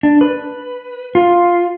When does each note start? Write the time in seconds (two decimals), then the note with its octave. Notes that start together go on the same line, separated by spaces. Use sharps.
0.03 D4
0.21 B4
1.15 F4